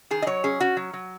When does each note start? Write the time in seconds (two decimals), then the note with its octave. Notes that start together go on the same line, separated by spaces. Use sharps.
0.11 D#3 G#4
0.22 D#5
0.27 F#3 C#5
0.44 C#4 G#4
0.60 C#4 F#4
0.77 F#3
0.93 F#3